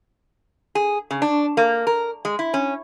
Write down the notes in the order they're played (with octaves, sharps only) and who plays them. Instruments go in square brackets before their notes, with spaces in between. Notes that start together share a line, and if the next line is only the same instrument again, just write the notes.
[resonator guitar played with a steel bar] G#4
C#3
D4
A#3
A#4
G#3
E4
C#4